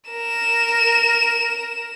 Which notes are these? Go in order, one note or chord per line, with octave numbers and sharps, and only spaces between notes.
A#4 E7